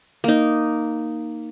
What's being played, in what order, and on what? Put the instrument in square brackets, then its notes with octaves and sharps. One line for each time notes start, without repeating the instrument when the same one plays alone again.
[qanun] A#3 D#4